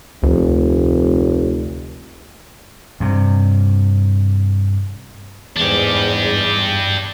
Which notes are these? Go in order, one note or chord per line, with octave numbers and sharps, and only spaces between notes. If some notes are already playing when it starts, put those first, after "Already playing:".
F1 D2
G2 C3
E2 G#2 D4 G4